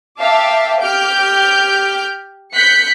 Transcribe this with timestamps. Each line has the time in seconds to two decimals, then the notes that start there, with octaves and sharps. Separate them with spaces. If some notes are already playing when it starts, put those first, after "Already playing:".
0.19 E5 F5 G5 A5 D6
0.80 G4 F6 G6 D7
2.53 F#6 G6 B6 C#7